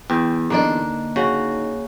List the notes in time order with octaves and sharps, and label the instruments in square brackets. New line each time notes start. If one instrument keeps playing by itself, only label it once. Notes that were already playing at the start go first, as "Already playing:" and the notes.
[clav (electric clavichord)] E2 [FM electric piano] G5
[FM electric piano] D3 D#4 [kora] A#3 D4 D5
[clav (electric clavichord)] C#3 [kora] F#4